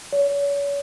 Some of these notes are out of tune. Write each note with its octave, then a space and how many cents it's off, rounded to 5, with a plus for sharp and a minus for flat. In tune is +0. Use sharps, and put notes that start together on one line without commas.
C#5 +35